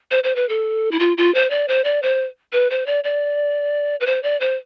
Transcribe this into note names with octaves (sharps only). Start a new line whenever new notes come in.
C5
C5
B4
A4
E4
F4
F4
C5
D5
C5
D5
C5
B4
C5
D5
D5
B4
C5
D5
C5